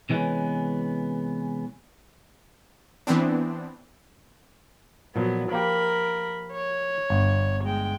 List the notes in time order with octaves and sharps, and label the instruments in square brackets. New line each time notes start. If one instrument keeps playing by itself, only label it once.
[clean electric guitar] C3 E3 G3 G#3 B3 C#4
[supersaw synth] E3 B3 C4 D4
[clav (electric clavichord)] A#2 F3 [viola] F#3 B3
[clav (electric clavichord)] F3 A#3 G4 [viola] A#4 B5
[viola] C#5
[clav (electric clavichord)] G1
[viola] G#3 G5